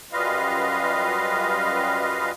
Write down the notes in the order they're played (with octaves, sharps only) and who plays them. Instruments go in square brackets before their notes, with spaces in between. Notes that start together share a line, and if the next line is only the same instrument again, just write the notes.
[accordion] F#2 G3 F4 B4 D#5 F5